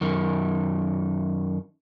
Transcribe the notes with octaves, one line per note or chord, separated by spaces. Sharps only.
F#2 D#3